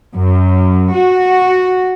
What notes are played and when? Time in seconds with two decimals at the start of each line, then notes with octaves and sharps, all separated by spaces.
0.15 F#2
0.93 F#4